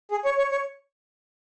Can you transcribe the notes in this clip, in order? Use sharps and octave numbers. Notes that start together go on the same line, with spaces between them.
G#4
C#5
C#5
C#5